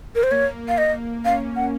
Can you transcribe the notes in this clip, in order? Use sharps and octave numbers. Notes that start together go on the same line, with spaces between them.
A#4
C5
A#3 C#5
F5
D#5
C#4 F5
F#5